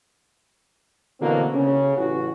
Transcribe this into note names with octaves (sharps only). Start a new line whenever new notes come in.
B2 D3 E3 F#3 A#3 C4
C#3
A1 F#4